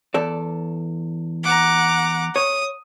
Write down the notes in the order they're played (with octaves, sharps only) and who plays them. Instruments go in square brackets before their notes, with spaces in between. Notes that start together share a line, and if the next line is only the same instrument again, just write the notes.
[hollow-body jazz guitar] E2 A4 D5
[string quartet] F#5 A#5 D6
[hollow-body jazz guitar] C#5 [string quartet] D#6